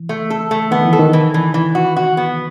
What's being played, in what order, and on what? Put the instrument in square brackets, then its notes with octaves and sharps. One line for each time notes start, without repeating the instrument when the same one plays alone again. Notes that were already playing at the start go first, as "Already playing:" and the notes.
Already playing: [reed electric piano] E3
[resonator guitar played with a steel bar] A3
A4
A3
[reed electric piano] D#3 [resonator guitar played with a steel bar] B3
[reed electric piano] E3
[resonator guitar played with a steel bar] A4
[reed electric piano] D#3
[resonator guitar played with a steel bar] E3
E3
E3
F#4
F#4
B3